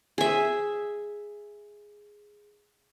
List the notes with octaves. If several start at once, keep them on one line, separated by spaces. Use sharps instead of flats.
G#4 E5